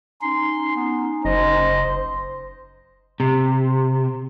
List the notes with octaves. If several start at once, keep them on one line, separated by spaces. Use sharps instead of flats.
C#4 D#4 C6
B3
F#1 C5 D#5
C3